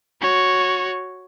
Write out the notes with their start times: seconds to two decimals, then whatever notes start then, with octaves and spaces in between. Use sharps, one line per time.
0.21 F#4 C#5